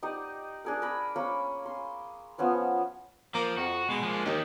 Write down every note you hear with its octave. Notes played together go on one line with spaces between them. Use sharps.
D#4 G4 D5 D#5
D4 G#4 A#4
A#4 B5
A#3 C#4 C#5 B5
C6
F3 B3 C#4 B4
F3 A#3
F2 F#4
B2 G#3
F3 A#3
D#2 G4 D#5